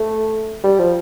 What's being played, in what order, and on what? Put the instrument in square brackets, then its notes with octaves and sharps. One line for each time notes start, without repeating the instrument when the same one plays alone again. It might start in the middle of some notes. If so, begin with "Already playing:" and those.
Already playing: [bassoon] A3
G3
F3